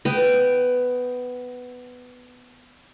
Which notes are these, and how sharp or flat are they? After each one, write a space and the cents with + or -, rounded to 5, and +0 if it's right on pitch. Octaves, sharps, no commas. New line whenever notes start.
B3 +10 G5 -5